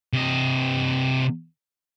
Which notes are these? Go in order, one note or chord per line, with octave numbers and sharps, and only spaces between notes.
C3 D#5